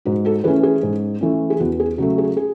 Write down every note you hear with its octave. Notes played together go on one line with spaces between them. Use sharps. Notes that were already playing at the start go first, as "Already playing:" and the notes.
G#2 F#4
F#4 A4
E3 A3 C#4 G#4 B4
G#4
G#2
E3 A3 C#4
G#4
E2 F#4
G#4
C#3 F#3 A3 F#4
G#4
G#4